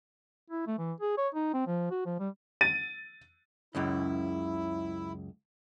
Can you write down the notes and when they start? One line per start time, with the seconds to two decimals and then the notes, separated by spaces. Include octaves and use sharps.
0.50 E4
0.67 A3
0.78 E3
1.00 G#4
1.18 C#5
1.34 D#4
1.54 C4
1.67 F3
1.90 F#4
2.06 F3
2.19 G3
2.61 A6 D#7
3.75 C#2 F#2 C#3 E4